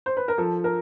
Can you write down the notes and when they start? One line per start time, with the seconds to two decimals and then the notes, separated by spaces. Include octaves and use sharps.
0.06 C5
0.17 B4
0.28 A#4
0.38 F3 A4
0.64 A#4